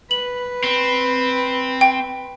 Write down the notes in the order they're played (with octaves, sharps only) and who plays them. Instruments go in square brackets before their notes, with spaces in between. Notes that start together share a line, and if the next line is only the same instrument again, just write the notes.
[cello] B4 [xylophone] F#7
[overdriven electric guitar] C4
[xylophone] G5